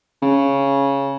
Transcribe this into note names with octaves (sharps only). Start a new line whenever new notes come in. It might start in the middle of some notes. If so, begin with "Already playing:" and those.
C#3